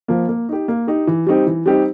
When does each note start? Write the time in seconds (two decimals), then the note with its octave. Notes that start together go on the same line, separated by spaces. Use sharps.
0.08 F3 A#3
0.28 A#3
0.49 D#4 G4
0.68 A#3
0.87 D#4 G4
1.07 E3
1.27 G3 C4 D#4 G4
1.46 E3
1.66 G3 C4 D#4 G4